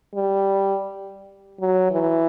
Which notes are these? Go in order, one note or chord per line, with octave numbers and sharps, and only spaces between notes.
G3
F#3
E3